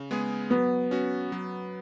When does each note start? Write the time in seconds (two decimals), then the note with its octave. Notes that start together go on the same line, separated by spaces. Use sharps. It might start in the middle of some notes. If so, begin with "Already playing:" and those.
Already playing: C#3
0.11 G#3 B3 G#4
0.50 F#3 B3
0.91 C#4 F#4
1.32 F#3